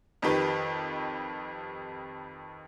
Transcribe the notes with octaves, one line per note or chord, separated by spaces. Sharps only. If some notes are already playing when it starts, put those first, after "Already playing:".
F2 D#3 G4 B4